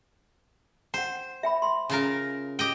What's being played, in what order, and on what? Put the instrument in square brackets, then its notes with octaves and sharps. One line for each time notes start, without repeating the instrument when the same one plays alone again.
[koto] C5 [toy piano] F#5 G5
[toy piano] E5 G5 B5
B5 C6
[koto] C#3 F4 A#4
G4 D#5 G5